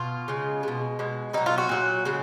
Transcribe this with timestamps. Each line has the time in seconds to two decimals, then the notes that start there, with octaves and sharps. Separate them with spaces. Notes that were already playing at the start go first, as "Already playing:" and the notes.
Already playing: B2 F4
0.28 C#3 G#3
0.63 B2 G#3
0.99 B2 G#3
1.33 B2 D#4
1.37 F#3
1.46 F4
1.58 F#4
1.69 A#2 F#3
2.05 C#3 G#3